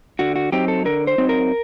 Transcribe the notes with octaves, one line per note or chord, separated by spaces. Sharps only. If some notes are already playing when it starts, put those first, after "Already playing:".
D3 F#4
F#4
F#3 C4 D#4 G4
A4
D3 A#4
C5
F#3 C4 D#4
A#4